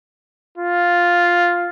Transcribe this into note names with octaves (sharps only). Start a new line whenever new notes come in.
F4